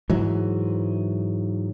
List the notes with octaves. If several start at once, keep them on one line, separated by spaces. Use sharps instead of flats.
G#2 E3 F#3